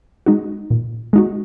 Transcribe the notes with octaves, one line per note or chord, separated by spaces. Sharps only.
G#3 D#4 F#4
A#2
G#3 D#4 F#4